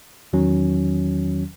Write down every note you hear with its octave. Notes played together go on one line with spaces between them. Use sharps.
E2 D#3 F#3 C#4